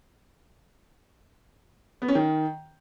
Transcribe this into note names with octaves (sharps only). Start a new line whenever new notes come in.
B3
C#4
D#3